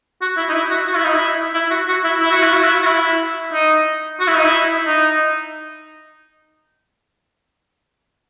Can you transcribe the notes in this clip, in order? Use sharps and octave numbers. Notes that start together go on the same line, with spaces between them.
F#4
E4
D#4
E4
F#4
F#4
E4
D#4
E4
E4
F#4
F#4
E4
E4
F#4
E4
F#4
E4
F#4
E4
D#4
F#4
E4
D#4
E4
D#4